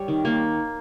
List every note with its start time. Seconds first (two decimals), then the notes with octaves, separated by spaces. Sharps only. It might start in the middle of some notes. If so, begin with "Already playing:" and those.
Already playing: G3 C#5
0.08 D#3
0.25 A#3